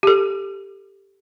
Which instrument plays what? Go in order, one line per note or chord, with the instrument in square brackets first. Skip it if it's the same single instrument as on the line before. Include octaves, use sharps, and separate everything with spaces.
[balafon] G4 A4